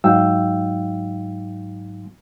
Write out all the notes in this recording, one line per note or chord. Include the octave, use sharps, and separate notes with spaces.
G#2 F#3 D#4 F5 G5 E6